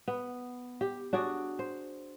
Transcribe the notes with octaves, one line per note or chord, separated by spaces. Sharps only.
B3
G4
D4 F#4 G#4 D5
C5